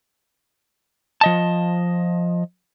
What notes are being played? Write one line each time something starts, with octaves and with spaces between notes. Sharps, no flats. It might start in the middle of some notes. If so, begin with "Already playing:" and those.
F3 D#5 A5